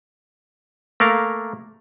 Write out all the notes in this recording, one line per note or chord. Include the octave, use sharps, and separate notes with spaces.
A3 A#3 A#4 F5